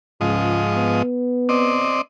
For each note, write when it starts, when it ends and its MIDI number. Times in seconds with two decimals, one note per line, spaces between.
0.21 0.64 37
0.21 1.02 44
0.21 1.02 53
0.21 1.02 75
0.75 1.95 59
1.49 2.01 60
1.49 2.01 74
1.49 2.01 75